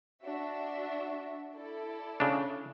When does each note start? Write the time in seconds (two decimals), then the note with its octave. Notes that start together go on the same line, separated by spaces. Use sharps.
0.24 D4 F#4 E5
1.52 E4 A4 D5
2.20 C#3 D4